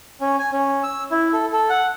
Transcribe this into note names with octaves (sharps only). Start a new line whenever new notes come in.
C#4
G#5
C#4
E6
E4
A4
A4
F#5